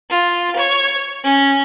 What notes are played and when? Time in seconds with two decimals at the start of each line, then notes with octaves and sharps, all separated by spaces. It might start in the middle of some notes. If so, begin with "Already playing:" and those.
0.10 F4
0.56 C#5
1.24 C#4